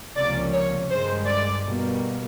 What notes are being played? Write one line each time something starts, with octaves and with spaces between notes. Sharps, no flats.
C#2 C3 F3 A#3 C#4 D5
C#5
G2 D#3 G#3 C5
D5
B2 G3 A#3